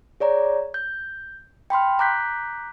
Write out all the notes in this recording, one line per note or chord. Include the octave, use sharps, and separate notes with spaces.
G#4 C#5 D5 A#5
G6
G5 B5 C6 F6
A#5 D6 F#6 G6 B6